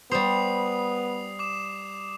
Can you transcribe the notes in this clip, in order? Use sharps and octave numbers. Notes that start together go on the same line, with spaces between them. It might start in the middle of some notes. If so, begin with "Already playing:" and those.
G3 B3 C5 D#6 C7 F7
D6 E7